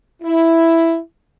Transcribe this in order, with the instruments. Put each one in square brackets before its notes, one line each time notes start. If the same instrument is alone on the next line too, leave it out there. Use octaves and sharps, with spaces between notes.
[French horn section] E4